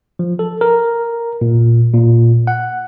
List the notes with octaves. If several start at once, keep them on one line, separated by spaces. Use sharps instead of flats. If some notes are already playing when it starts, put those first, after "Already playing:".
F3
A4
A#4
A#2
A#2
F#5